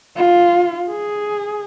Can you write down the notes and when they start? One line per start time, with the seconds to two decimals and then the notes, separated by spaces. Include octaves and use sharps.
0.16 F4
0.90 G#4